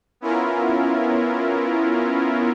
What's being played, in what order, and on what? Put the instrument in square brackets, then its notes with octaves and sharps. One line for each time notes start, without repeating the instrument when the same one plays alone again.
[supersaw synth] B3 C#4 E4 F4 A#4